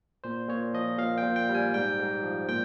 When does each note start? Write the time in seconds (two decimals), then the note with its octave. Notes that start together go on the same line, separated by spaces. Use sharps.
0.24 A#2 C5
0.48 A#2 C#5
0.74 F3 D#5
0.99 A#2 F5
1.18 G5
1.23 A#2
1.36 G5
1.49 G3
1.55 G#5
1.74 G#2 G5
1.99 G#2
2.23 F3
2.48 A#2 G5